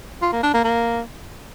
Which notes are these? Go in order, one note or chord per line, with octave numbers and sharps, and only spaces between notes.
F4
A#3
D4
A#3
A#3